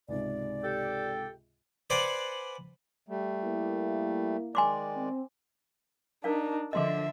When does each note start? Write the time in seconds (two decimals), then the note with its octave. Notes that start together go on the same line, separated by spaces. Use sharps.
0.08 C#2 G#2 C3 D5
0.64 G4 A4 G5
1.90 B4 C5 D5 F#5 G#5
3.09 G3 A3
3.44 A#3 E4
4.55 D#3 G#3 D5 G#5 C6 D6
4.96 C4
6.24 D4 D#4 A#4 D5 F5
6.73 D3 F3 D#5 E5 C6 D6